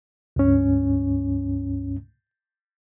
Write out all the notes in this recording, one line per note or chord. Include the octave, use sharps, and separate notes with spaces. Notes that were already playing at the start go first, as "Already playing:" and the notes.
C#2 G2 C#4